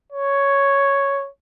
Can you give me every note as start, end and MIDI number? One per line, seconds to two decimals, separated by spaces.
0.12 1.29 73